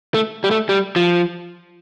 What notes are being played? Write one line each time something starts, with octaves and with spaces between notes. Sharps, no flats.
A3
G3
A3
G3
F3